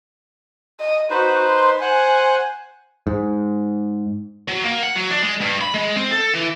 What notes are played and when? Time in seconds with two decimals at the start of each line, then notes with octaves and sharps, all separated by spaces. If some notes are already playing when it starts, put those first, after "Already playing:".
0.80 D#5
1.10 D#4 F#4 B4 C5
1.50 C6
1.81 C5 F#5 G#5 F#6
3.07 G#2
4.48 F#3
4.64 A#3
4.83 F#5
4.96 F#3
5.10 D4
5.22 G#3
5.40 G2
5.61 B5
5.74 G#3
5.97 C4
6.12 A4
6.34 E3